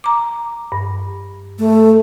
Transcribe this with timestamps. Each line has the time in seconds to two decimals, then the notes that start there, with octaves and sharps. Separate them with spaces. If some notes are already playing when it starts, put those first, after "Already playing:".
0.04 A#5 D6
0.72 G2
1.59 A3